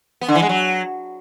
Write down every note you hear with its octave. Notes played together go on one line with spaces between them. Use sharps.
B3
D3
E3
G#3
F#3